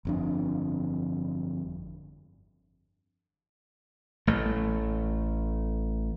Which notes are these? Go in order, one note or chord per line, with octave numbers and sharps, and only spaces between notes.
G1 F2 D4
A1 A3